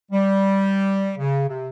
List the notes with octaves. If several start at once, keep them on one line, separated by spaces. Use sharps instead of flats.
G3
C#3
C3